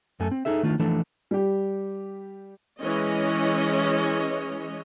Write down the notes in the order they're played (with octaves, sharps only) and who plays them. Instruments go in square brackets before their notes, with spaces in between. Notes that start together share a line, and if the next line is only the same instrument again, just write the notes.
[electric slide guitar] F#2 A3 A4 G#5
C4
D#4 G#4 A4 E5
D#3 A3 D4 F4
E3 F3 A3 D4 A4
[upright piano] G3 G4
[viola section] E3 G#3 C#4 C#5 D#5